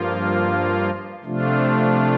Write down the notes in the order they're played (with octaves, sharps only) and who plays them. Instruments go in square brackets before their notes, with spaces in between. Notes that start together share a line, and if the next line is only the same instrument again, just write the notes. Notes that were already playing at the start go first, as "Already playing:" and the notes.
Already playing: [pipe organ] G2 F3 A#3 F4
C3 F3 A3 D4 F4